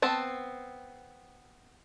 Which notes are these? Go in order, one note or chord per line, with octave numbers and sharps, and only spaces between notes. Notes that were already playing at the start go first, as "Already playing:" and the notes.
B3 C4 A5